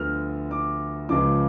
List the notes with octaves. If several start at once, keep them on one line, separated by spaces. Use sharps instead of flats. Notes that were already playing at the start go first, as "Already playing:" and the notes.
Already playing: D2 D3 F3 B3 F6
D6
C#2 C#3 F3 D6